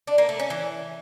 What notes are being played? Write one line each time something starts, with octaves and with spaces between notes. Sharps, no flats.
D4
A#3
A3
C#4
E3